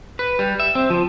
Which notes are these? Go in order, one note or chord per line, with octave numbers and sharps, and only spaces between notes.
B4
G3
E5
C4
F3